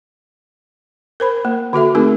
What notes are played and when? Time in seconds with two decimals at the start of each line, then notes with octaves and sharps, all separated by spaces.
1.20 A#4 C5 B5
1.45 A#3
1.73 D3 F#4 A4 E5
1.95 A3 C4 D#4 G#4 A#4